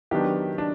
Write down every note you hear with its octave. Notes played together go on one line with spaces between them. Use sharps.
D#3 F#3 B3 D4 G4
D4